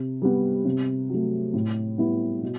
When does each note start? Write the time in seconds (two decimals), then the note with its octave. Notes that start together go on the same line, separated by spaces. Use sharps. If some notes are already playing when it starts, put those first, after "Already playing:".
Already playing: C3
0.22 G3 B3
0.65 C3
1.10 F#3 A3
1.54 A2
1.98 G3 B3 E4
2.42 B2